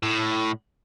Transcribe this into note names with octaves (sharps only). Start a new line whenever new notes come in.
A2